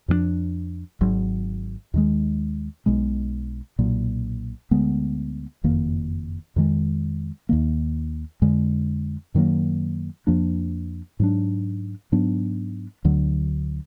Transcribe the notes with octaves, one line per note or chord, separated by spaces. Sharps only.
F2 F3 A#3 D4
G#1 G#2 F#3
D#2 D#3 G#3
B1 B2 G#3
B1 A#2 F#3
D2 D3 G#3 B3
F#1 F2 D#3 A#3
F2 D#3 G#3
D#2 D#3 A#3
F2 D3 G#3
F#2 D#3 F#3 A#3
F2 F3 A#3 D4
G#2 F#3 D4
G#2 F#3 B3 D4
D2 D3 F#3